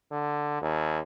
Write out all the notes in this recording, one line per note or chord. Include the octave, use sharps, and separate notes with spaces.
D3
D#2